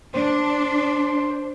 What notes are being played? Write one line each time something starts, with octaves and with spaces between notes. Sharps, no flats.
D4 C5